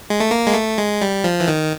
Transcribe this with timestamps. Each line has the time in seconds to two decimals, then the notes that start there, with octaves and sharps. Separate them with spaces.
0.10 G#3
0.20 A3
0.31 A#3
0.47 G#3
0.54 A3
0.78 G#3
1.02 G3
1.24 F3
1.40 E3
1.48 D#3